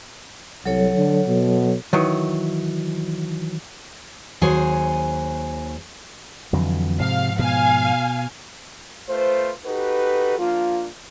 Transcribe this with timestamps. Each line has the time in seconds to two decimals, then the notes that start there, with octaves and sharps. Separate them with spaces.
0.65 C2 F#3 A4 C#5
0.96 D3
1.28 B2
1.93 D#3 E3 F#3
4.41 D#2 F#3 G#4 C5 G#5
6.53 F2 D3 E3 F#3
7.00 G#2 C3 F3 F5
7.39 B2 F5 G#5
9.09 A3 F4 B4 C5
9.65 D#4 F#4 G4 A4 B4
10.39 F3 A#3 D4 F4